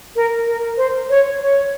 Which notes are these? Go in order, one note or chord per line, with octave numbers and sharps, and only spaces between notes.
A#4
A#4
C5
C#5
C#5